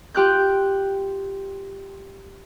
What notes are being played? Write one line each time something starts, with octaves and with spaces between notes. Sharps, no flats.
F4 G4 F#6 G6